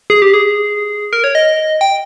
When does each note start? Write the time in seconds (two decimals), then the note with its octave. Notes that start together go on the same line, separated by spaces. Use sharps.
0.10 G#4
0.22 G4
0.33 G#4
1.13 A#4
1.24 C#5
1.35 D#5
1.81 G5